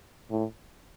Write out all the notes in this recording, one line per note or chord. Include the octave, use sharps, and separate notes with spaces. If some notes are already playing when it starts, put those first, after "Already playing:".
A2